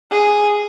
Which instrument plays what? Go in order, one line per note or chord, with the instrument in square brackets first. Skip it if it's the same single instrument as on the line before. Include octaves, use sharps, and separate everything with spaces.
[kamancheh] G#4